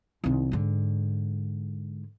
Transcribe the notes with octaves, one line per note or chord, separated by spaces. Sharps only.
C2 D#3
G#2 D3